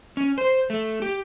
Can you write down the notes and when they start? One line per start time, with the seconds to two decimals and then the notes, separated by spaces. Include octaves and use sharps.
0.17 C#4
0.38 C5
0.70 A3
1.02 G4